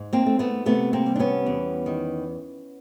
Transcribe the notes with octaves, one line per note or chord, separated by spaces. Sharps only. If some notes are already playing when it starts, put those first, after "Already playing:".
Already playing: G#2
A#3 C4
A3
A3 B3
C3 A3 B3
A#3 C4
G3
D4
B3 C#4
E2
D#3